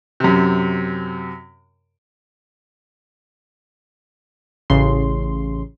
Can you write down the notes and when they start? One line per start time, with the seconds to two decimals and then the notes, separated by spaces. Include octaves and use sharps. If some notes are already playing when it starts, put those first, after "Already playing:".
0.20 F#2 C3
4.70 A1 C#3 C6